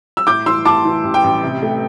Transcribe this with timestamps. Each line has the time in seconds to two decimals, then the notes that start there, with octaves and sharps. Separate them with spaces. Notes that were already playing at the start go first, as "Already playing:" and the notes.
0.17 E6
0.27 A2 D6 G6
0.46 E3 C6 E6
0.65 A2 A5 D6
0.85 E3
1.04 A1
1.14 G5
1.24 A1
1.43 C3
1.62 A3